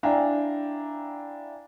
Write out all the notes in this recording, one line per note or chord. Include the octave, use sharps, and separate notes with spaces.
D4 E4 F5 G5 G#5 A#5